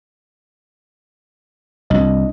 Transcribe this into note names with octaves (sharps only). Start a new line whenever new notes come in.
C2 D4 D#5